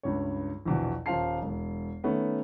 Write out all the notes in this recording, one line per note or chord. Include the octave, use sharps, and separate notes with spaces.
C#2 G2 C#5
A#1 E2 B2
D#1 F4 C5 F5 A5 C7
E1
D#3 A3 B3 C#4